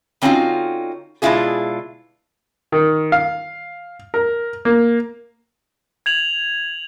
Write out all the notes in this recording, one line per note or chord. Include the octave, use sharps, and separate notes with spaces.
D3 C4 C#4 D#4 F4 F#4
B2 G#3 D4 E4 F4 G#4
D#3
F5
A#4
A#3
G#6 F7 F#7